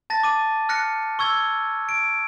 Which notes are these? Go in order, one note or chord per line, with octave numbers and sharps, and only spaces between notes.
A5 A6 A#6
D6 D#7
F6 F#6 A#6 C#7
C#6 E6 G#6
D7